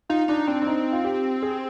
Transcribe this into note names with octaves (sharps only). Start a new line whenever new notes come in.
D#4 F4
D4 D#4
C4 D4
D4
D#4
F4
G4
G#4